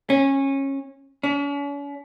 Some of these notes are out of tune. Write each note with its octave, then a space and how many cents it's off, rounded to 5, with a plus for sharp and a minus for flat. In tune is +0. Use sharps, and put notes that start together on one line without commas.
C#4 -20
C#4 +45